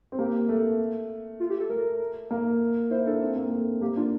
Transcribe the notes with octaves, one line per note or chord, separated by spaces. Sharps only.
C4
A#3 G4
A3
F4
G4
A4
A3 A#4
A#3
E4 C5
D4 A4
C4
A#3
A3
A#3 G4
D4 F4